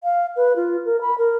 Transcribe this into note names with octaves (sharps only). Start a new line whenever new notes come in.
F5
B4
F4
A#4
B5
A#4